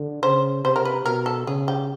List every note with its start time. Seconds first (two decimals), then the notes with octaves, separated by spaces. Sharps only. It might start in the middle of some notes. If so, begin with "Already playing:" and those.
Already playing: D3
0.22 C#3 C5
0.64 C3 C5
0.76 A#4
0.85 B4
1.05 B2 A#4
1.26 A4
1.47 C#3 G#4
1.68 G4